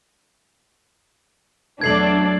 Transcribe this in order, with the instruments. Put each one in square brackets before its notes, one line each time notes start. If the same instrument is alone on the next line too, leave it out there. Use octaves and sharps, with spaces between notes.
[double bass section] E2 F#3 A3 [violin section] D4 D5 [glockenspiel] G#6 C7 F#7